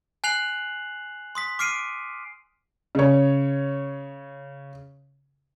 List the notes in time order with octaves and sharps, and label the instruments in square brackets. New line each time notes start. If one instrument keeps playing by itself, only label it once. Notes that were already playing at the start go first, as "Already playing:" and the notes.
[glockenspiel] G#5 F#6 C7 F7 F#7
C6 D#6 B6
D6 F6 C7 D7 D#7
[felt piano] C#3 C#5